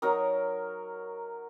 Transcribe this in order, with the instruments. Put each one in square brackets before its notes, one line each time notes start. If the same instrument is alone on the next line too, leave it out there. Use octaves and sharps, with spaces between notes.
[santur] F#3 D#4 A#4 D#6